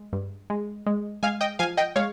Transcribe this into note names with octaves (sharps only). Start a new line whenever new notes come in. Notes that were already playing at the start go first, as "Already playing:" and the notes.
Already playing: G#3
G2
G#3
G#3
G#3 F5 G#5
D#5 G5
F3 F5 G#5
D#5 G5
G#3 C#5 F5